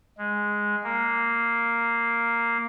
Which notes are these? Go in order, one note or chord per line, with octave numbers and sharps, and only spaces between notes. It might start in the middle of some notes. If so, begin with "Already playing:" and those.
G#3
A#3